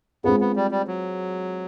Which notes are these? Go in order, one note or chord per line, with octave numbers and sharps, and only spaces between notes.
G#3 B3 C4 F4 G#4
B3
G3
G3
F#3